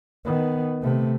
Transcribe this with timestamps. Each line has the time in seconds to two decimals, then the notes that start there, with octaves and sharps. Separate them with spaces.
0.25 D#3 B3
0.83 C3 A3